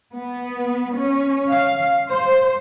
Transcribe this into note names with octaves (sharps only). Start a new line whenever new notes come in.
B3
C#4
F5
C5